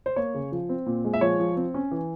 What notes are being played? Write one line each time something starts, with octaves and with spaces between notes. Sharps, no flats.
C5
A#3 C#5
C#3
F3
C4
A#2
G#3
E5
F3 C#5
F3
C4
C#4
E3